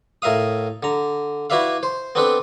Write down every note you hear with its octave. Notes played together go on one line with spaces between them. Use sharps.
A2 A#4 E5 F5 D#6
D3 A#5
E4 F#4 B4 D5 E5 F5
C5
B3 C4 D4 A4 B4